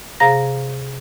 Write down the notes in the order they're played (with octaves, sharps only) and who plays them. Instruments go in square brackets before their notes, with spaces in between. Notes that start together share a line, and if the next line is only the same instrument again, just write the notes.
[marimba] C3 G#4 F5 A#5 A#6